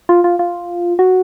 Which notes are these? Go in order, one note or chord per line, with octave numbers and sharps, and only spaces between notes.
F4
F4
F4
F#4